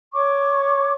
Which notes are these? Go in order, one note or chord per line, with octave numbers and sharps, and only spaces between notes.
C#5 C#6 D6